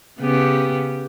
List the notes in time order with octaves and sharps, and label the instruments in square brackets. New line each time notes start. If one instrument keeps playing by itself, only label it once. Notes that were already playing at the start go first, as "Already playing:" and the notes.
[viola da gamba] C#3 B3 G4